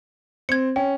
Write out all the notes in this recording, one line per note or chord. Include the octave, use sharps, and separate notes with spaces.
C4 G#6 C#7
C#4 G5